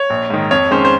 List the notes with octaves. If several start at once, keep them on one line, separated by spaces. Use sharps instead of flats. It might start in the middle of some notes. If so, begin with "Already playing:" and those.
Already playing: C#5
A#1
G#2 D#3
F2 C#5
D#3 G#3 C#4 C5
C5